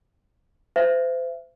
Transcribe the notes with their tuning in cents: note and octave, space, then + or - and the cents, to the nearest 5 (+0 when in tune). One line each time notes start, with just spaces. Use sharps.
C5 -35 E5 +30